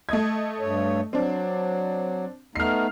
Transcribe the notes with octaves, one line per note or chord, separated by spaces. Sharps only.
A3 D#5 G#6
G2 C#5
F#3 C4 D4
A3 B3 D#4 F6 C7